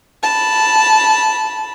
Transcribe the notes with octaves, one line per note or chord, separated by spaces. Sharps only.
A5 B5